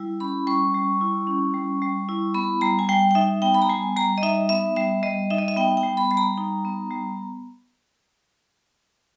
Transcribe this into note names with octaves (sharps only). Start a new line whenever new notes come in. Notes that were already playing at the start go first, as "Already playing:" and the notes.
Already playing: G3 E4
C#4 B5
G3 C#6
G3
E4
C#4
G3
G3
E4
B3 B5
G3 A#5
G#5
G3 G5
G5
D#4 E5
B3 G5
B5
A#5
G3 G#5
G3 A#5
D#5
D#4 E5
B3 E5
G3 E5
G3 D#5
D#4 E5
D#5
E5
B3 G5
G5
G3
B5
G3 B5
A#5
D#4
B3
G3